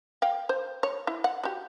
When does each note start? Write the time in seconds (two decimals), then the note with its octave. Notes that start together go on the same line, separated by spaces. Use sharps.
0.22 F5 G5
0.49 C5
0.83 C#5
1.07 E4
1.24 F#5
1.44 F#4 G4